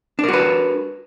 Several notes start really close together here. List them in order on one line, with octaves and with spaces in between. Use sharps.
D4 A#4 F#4 B4